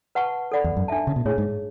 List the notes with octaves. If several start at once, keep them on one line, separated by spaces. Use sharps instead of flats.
B4 F#5 A5 C#6
A4 D5 F#5 B5
E2
F#2
D4 A4 E5 A5
C#3
B2
A2 D4 G#4 C#5
G#2